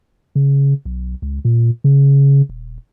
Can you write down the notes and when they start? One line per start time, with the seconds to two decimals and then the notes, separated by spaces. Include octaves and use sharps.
0.35 C#3
0.85 B1
1.22 C#2
1.45 A#2
1.84 C#3
2.49 D#1